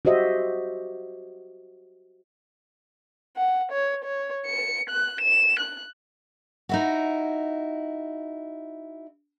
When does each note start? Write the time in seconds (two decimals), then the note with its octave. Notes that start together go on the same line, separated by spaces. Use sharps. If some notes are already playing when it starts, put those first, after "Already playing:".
0.05 F#4 G4 C5 D#5 E5
3.37 F#5
3.72 C#5
4.04 C#5
4.46 C#7
4.90 F#6
5.21 E7
5.59 F#6
6.69 D#4 E4 F#4